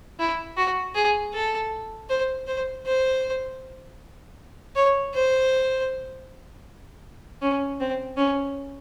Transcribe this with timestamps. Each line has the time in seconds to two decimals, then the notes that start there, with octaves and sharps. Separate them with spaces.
0.19 E4
0.57 F#4
0.95 G#4
1.34 A4
2.10 C5
2.47 C5
2.86 C5
4.75 C#5
5.14 C5
7.41 C#4
7.80 C4
8.17 C#4